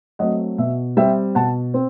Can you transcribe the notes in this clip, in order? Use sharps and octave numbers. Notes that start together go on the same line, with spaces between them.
F#3 A3 C4 D#5 F#5
B2 E5
G3 C4 E5 G5
B2 F#5 A5
C4